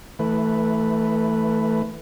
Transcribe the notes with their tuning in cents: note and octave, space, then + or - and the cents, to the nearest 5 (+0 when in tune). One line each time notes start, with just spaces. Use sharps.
E3 -15 A3 +10 B4 +0